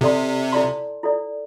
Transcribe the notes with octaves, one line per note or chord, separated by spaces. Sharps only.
C3 E4 A4 D5 A5 C6
E4 A4 D5 A5 C6
E4 A4 D5